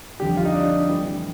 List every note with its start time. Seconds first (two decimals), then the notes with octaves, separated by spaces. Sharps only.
0.20 F2 D3 G3 G4
0.37 F4
0.45 D#4
0.54 D4
0.88 A2 E3 G3